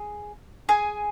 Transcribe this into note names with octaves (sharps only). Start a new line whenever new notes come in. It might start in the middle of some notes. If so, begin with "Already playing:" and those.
Already playing: G#4
G#4 G#5